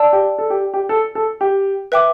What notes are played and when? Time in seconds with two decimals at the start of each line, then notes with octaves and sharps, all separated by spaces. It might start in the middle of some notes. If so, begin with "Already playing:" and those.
Already playing: D5 A5 E6
0.13 G4
0.39 A4
0.50 G4
0.74 G4
0.89 A4
1.15 A4
1.41 G4
1.92 B4 E5 G5 D6